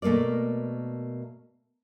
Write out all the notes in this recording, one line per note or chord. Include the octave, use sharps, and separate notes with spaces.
B2 A3 A#3 A#4 D5